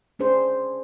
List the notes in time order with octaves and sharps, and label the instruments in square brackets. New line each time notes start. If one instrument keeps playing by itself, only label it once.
[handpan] C#4 D4 G#4 C5